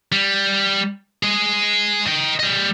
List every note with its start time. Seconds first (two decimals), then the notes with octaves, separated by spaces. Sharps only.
0.12 G3
1.23 G#4 D#5
2.07 D#5 G5
2.40 G3 D#5